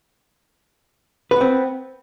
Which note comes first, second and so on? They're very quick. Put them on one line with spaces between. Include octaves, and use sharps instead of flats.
B4 B3 C4